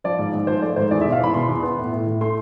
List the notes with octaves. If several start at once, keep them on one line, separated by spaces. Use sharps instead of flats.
F3 D5
G#2
G#2
F3 C5
A3 D5
G#2 C5
E2 D5
E5
B2
F5
E2 B5
B2 C6
E2
B3
A2
A2
A2
A3 C6